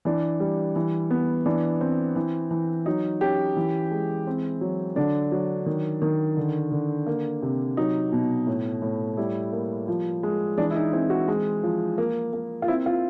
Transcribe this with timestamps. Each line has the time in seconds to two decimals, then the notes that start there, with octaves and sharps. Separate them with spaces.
0.05 E3 D4
0.40 G3
0.76 E3
1.11 B3
1.46 E3 D4
1.81 C4
2.16 E3
2.51 E3
2.86 F#3 D#4
3.21 C#4 G4
3.56 E3
3.91 G#3
4.27 C4
4.61 F#3
4.96 D3 D4
5.32 F#3
5.66 D#3
6.02 D#3
6.37 D3
6.71 D3
7.06 A#3
7.42 C3
7.77 F#3 D#4
8.12 B2
8.47 A2
8.82 A2
9.17 G3 E4
9.53 A#3
9.88 F3
10.23 G#3
10.58 E3 D4
10.71 E4
10.76 D#4
10.93 C4 E4
11.10 F#4
11.28 G#3
11.63 F3
11.98 A#3
12.33 A#3
12.62 F4
12.68 C4 E4
12.86 F4